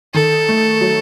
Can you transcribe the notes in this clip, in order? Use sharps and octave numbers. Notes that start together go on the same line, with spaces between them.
D#3 A4
A3
F#3